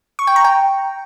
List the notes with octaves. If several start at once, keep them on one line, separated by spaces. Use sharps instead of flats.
C#6
G5
A#5
G5